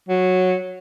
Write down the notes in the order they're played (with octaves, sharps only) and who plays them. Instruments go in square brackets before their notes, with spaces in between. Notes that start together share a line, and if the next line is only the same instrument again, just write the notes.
[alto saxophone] F#3